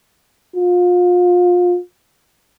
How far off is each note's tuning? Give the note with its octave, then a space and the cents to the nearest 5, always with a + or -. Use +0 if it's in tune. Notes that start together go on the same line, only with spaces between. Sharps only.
F4 +30